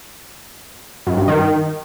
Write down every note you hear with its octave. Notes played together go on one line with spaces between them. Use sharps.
F#2
G2
D#3